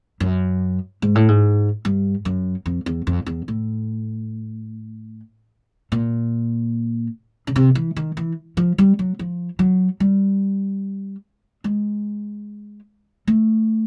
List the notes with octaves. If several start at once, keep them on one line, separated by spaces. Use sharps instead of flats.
F#2
G#2
A2
G#2
G2
F#2
F2
E2
F2
E2
A2
A#2
C#3
C3
E3
D#3
E3
F3
G3
F#3
F3
F#3
G3
G#3
A3